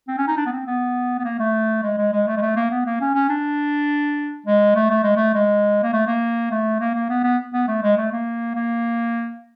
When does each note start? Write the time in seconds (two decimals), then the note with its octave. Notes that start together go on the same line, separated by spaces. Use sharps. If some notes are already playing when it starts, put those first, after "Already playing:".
0.08 C4
0.18 C#4
0.28 D#4
0.37 D4
0.46 B3
0.52 C4
0.67 B3
1.19 B3
1.25 A#3
1.40 A3
1.83 G#3
1.98 G#3
2.13 G#3
2.28 A3
2.37 G#3
2.42 A3
2.56 A#3
2.71 B3
2.86 A#3
3.00 C#4
3.15 C#4
3.29 D4
4.46 G#3
4.75 A3
4.91 A3
5.03 G#3
5.16 A3
5.34 G#3
5.83 A#3
5.93 A3
6.07 A#3
6.51 A3
6.80 A#3
6.95 A#3
7.10 B3
7.24 B3
7.53 B3
7.68 A3
7.83 G#3
7.97 A3
8.12 A#3
8.55 A#3